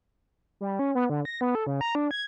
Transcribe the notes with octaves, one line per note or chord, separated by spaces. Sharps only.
G3
C#4
B3
D3
A#6
B3
A4
C#3
A#5
D4
G#6